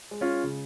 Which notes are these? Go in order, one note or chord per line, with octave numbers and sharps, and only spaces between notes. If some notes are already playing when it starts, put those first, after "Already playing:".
G#3
C#4 F4
C#3